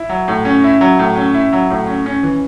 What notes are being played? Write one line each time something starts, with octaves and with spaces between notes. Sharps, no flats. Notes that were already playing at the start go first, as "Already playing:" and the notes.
Already playing: E4
F#3
A2
C#4
E4
F#3
A2
C#4
E4
F#3
A2
C#4
C#4
E3